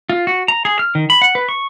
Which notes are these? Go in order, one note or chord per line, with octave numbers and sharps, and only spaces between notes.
F4
F#4
A#5
G#4
F6
D#3
B5
F#5
B4
C#6